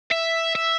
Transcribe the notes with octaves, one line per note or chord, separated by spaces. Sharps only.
E5
E5